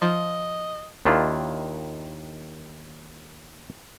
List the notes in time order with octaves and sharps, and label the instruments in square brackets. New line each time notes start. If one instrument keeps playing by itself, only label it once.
[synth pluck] F3 [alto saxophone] D#5
[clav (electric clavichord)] D#2 D#3 D4 E4 F4